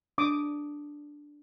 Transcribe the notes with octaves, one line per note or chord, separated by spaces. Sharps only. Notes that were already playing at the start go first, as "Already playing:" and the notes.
D4 D6 D#6